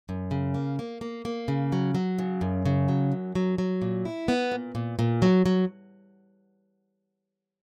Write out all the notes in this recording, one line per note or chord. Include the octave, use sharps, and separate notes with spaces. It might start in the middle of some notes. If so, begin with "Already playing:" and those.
F#2
C#3
A#3
A#3
A#3
A#3
C#3
F#3
F#3
C#3
F#2
C#3
F#3
F#2
F#3
F#3
A#2
E4
B3
A#2
A#2
A#2
F#3
F#3